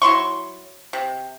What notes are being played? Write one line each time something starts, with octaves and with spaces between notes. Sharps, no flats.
F#3 E4 C6 C#6
C3